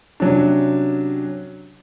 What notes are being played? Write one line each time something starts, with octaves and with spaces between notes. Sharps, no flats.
C3 F#3 C#4 D4